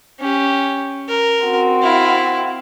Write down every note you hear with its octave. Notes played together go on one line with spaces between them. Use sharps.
C#4 G4
A#4
C4 F#4
E4 F5